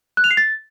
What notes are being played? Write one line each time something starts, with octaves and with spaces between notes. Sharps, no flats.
F#6
F7
C7
A6